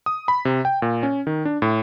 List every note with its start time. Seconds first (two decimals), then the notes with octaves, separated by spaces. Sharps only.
0.06 D#6
0.28 B5
0.45 C3
0.65 G5
0.82 A#2
1.03 C#4
1.27 D#3
1.45 D4
1.62 A2